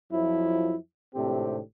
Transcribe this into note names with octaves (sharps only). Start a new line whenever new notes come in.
F2 F3 F#3 E4
G#1 A2 C3 C4 D4 G4